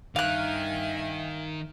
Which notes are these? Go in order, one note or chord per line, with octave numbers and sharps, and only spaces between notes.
G2 D#3 E5 F5 G#5 F#6